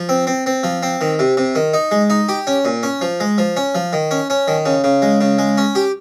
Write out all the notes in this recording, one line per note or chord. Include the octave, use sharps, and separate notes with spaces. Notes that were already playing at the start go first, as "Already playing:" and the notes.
Already playing: F3
C4
C4
C4
F3
C4
D#3
C3
C3
D#3
D#4
G#3
D#4
G4
C#4
A#2
C#4
F3
G#3
F3
C#4
F3
D#3
C#4
C#4
D#3
C#3
C#3
G#3
C#3
G#3
C#4
G4